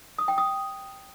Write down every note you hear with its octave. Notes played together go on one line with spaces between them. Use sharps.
D#6
G5
D#6